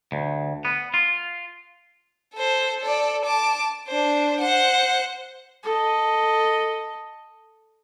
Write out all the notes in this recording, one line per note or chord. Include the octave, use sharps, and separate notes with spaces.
D2
B3
F4
A4 C5
A4 D5
A5 D6
D4 C5
C5 F#5
A4 D#5